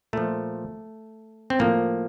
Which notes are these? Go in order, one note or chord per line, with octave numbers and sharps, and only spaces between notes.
A#2 F3 A3
C4
A2 F3 A#3